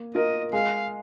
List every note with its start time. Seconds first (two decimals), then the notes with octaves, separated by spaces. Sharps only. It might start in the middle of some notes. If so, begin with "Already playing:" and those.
Already playing: A#3
0.15 F4 A#4 D#5
0.53 G#3 F5